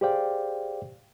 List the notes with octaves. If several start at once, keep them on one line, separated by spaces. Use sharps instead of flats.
G4 G#4 C5 D5 F5 G5